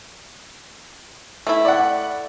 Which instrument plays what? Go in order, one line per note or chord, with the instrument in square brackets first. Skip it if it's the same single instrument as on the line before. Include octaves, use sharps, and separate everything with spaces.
[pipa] A3 E4
[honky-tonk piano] D5 F#5